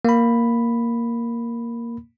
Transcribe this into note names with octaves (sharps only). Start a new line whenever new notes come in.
A#3 B5